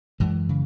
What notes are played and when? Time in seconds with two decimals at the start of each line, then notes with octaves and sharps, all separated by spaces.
0.20 F#2 E3 G#3
0.49 C#3